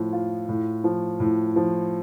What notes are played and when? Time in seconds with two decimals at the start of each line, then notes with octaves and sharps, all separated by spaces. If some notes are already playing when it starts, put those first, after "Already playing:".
Already playing: A2 F3
0.13 F4
0.49 A2
0.84 F3
1.20 A2
1.56 F3